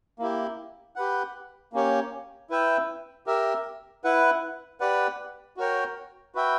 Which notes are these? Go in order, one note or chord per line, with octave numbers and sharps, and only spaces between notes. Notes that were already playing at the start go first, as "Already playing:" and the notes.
A#3 E4 G4
G4 B4 F#5
A#3 C#4 G4 C#5
E4 B4 E5 G5
G4 A#4 E5
E4 B4 F#5
G4 B4 D5 F#5
F#4 A#4 C#5 G5
F#4 B4 E5 G5